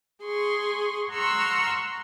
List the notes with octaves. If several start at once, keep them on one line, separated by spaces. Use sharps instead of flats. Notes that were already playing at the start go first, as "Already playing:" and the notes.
G#4 C6 C#6
F#5 A#5 C6 C#6 E6 F6